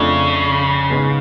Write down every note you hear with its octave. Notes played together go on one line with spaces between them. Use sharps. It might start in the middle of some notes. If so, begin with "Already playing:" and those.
Already playing: F2 C#3 F3 A3 D4
G#2 G#3 B3